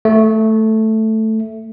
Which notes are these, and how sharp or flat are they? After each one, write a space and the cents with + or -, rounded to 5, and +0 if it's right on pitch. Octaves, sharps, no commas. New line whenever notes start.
A3 +0